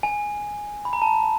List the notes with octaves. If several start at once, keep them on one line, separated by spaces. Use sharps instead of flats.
G#5
B5
A#5
A5